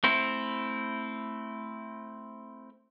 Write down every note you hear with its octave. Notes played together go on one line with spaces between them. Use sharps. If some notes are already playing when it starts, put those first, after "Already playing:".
A3 C4 E4